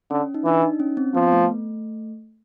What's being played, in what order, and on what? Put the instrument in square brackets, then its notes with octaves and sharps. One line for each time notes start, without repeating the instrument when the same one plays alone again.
[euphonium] D3 [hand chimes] C#4
[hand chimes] D#4
[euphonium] E3 [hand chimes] D4
[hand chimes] D#4
C#4
C4
[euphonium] F3 [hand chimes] B3
[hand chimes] A3